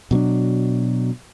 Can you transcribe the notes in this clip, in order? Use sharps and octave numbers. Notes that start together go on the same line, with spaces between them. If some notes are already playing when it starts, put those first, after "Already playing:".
B2 F#3 C4 D4